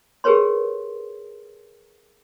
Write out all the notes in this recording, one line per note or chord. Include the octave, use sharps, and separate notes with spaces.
G4 G#4 A#4 B4 C#5 C6